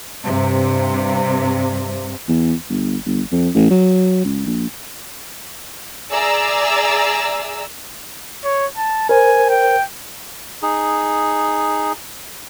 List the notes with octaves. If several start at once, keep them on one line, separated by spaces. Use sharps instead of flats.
G2 C3
E2
G1
G1
F2
A1
F#3
C#2
A#1
G#4 D5 E5 A#5 E6
C#5
A5
A#4 C5 G#5
G5
D#4 G#4